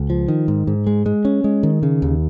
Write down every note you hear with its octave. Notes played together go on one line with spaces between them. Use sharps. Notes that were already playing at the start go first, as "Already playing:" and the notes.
Already playing: C#2
F3
D#3
G#2
G#2
G#3
G#3
C#4
G#3
D#3
C#3
D#2